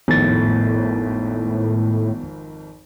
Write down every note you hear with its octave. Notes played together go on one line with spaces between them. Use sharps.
G#1 F2 A2 B3 A6